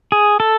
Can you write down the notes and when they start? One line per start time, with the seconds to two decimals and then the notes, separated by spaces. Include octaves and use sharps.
0.12 G#4
0.40 A4